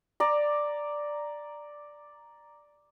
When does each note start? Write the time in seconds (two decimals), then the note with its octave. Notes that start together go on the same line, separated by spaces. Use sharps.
0.20 D5 A#5